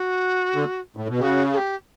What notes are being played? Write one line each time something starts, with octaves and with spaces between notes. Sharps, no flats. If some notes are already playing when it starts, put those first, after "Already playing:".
Already playing: F#4
D3
A2
B2
C#3 F#4 G4
A4
G4